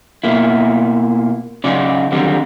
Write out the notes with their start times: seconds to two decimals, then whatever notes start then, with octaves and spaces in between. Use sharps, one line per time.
0.24 B2 A#3 E4
1.64 C#3 F#3 C#4 D#4 D5
2.12 D3 D#3 F#3 G3 C4